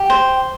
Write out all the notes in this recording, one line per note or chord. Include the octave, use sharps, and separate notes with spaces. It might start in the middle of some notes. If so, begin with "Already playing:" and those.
Already playing: G4
C5